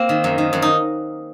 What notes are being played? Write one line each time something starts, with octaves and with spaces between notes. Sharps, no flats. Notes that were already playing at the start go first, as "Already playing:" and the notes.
Already playing: A#3 C4
D#3
F#2
D#3
F#2
D#4